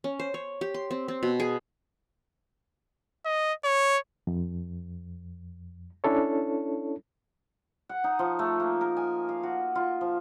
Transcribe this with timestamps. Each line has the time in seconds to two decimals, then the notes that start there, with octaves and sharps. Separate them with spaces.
0.04 C#4
0.20 C5
0.34 C#5
0.61 G4
0.74 C6
0.91 C4
1.08 C4
1.23 B2
1.40 G#4
3.25 D#5
3.64 C#5
4.27 F2
6.04 C#4 D4 E4 A4 C#5
7.89 F#5
8.04 D#4
8.19 F3
8.39 A3
8.60 A#3
8.81 A#4
8.97 G#5
9.29 F5
9.43 F#4
9.75 F4
10.01 F3